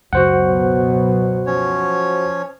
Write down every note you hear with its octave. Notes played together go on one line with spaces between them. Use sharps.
C#2 F#2 B2 F#3 B3 F#4 C5 F#5
F3 C#4 C#5